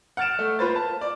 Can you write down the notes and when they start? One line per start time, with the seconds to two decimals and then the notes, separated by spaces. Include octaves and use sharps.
0.17 F#5 F6 A6 D7 E7
0.39 A3
0.59 A#3 F4 B4 C5 A6
0.76 A5
1.01 D5